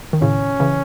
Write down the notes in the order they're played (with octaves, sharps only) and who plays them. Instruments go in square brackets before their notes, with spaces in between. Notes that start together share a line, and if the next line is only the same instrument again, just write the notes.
[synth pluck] D#3
[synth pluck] A2 C#3 [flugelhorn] C#4
[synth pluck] C#3 E3